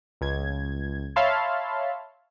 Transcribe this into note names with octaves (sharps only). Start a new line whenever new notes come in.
C#2 G#6
C#5 E5 F5 A5 B5 C6